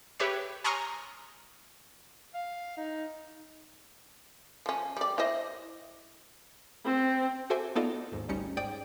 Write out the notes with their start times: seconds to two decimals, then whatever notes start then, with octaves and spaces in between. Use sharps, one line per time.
0.20 G4 B4 C#5 E5
0.64 G#5 A#5 C6 C#6 D#6 F6
2.34 F5
2.77 D#4
4.66 F3 C#4
4.97 G3 D5
5.18 E4 C5 D#5
6.85 C4
7.50 F#4 A4 C5 E5 G#5 D6
7.76 B3 D#4 F4 A4 D5 D#5
8.12 D#2 G#2
8.29 G#1 D2 G3 C#4 D#4 C#7
8.57 G#2 D5 G5 D#6 G6